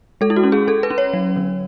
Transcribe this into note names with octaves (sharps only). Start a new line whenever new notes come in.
G#3 A4
E4
F#4
C#4
G#4
C#4 A4
B4
C#4
C#5
F#3
D3